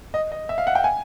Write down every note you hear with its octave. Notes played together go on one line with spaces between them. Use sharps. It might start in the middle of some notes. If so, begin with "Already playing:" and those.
D#5
D#5
E5
F5
F#5
G5
G#5